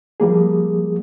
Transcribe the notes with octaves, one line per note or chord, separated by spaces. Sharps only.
F3 G3 A#3 G#4